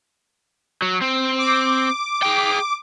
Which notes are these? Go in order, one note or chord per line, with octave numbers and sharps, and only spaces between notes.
F#3
C4
D6
G#4 G5